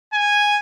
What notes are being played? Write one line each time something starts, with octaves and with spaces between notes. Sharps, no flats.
G#5